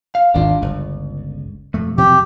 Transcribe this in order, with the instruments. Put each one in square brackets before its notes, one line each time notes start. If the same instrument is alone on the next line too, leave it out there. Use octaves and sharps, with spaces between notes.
[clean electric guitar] F5
[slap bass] G#1 E2 [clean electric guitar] D4 F4
[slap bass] G1 [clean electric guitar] C#2
[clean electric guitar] B1 F2 [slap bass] A3
[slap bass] C3 F3 F#3 [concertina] G4